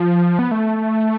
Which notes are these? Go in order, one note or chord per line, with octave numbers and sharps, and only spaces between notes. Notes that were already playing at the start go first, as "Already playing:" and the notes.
Already playing: F3
B3
A3